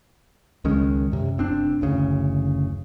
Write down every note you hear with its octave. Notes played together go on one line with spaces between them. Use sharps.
C#2 D#3 G#3 C#4
F#2 C3
F1 C4 D4
F#1 D2 C#3